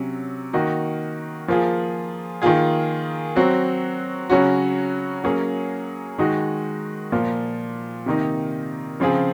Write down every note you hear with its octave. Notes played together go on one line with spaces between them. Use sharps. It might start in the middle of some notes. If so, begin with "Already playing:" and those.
Already playing: C3 F#3 C#4
D#3 A#3 D#4 F#4
F3 A#3 F4 G#4
D#3 A#3 F4 G#4
F#3 C4 F#4
C#3 F#3 C#4 F#4
F#3 A#3 C#4 G#4
D#3 G#3 D#4 F#4
A#2 F3 A#3 F4
C3 D#3 A#3 D#4
C#3 F3 C4 F4 G#4